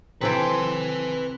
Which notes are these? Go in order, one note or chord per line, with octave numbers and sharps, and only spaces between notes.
C3 E3 C4 A4 B4 C5 G5 G#5